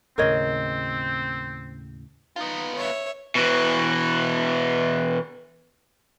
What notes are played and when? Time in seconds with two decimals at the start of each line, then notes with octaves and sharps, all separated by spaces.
0.18 D#2 A2 C#3 C4 A#4 C#5 D#5
2.36 B3 D#4 F4
2.76 C#5 E5
3.35 B2 E3